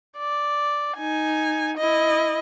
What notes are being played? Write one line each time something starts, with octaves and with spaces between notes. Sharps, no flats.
D5
D#4 G#5
E4 D#5